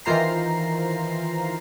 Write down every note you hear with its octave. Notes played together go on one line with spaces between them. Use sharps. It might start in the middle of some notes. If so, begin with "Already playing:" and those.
D#3 E3 F4 C5 A#5 C7